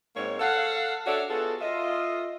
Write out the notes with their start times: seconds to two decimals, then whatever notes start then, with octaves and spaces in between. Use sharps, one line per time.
0.16 G#2 A#3 C4 C#5
0.40 A4 F5 F#5
1.06 D4 F#4 A4 C#5 D5 E5
1.29 B3 F4 F#4 G#4 A4
1.60 F4 D#5 E5